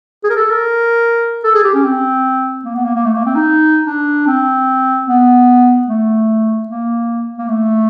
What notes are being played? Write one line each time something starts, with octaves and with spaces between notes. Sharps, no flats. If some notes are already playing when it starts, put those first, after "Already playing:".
G#4
A#4
A4
A#4
A4
G#4
G4
C#4
C4
A#3
B3
A#3
A#3
A3
A#3
C4
D#4
D4
C4
B3
A3
A#3
A#3
A3